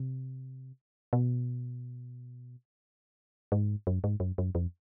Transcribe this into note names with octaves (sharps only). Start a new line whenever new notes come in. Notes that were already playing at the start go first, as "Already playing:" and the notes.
Already playing: C3
B2
G#2
F#2
G#2
F#2
F#2
F2